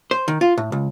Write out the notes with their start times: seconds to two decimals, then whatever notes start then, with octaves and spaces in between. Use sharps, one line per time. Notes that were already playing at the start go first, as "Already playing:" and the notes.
0.11 C5
0.28 D#3
0.41 F4
0.58 A2
0.72 C#2